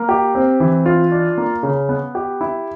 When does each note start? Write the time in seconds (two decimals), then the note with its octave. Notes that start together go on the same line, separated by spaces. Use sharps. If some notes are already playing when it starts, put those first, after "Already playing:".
Already playing: A#3
0.09 G4
0.35 C4
0.60 E3
0.86 F4
1.12 D4
1.38 A#3
1.63 C#3
1.89 B3
2.15 G4
2.41 E4